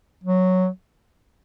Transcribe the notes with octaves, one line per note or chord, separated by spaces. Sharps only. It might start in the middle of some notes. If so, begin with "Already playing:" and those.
F#3